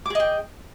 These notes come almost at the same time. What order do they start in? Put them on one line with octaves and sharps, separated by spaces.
D6 G#4 D#5 G5